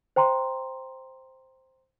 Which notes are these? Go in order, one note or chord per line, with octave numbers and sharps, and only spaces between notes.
C5 G5 A#5 C6